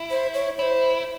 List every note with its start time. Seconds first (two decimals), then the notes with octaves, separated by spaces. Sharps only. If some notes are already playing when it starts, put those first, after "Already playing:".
Already playing: E4
0.10 C5
0.34 C#5
0.58 E4 C5 C#5